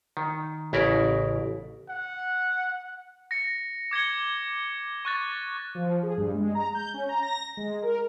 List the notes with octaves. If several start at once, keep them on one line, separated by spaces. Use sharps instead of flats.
D#3
A1 C#3 E4 A#4 D5
F#5
A#6 C#7
D6 G#6 C#7 G7
C#6 F#6 A6
F3
G#4
G2
G#3
A#5
G6
C#4
A#5
A#6
G#3
A#4